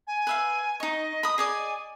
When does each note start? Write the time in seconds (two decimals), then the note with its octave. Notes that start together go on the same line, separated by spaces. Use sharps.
0.07 G#5
0.27 B4 E5 F5
0.80 D#4 D#5 C#6
1.23 B5 D#6
1.38 G#4 D5 D#5 G#5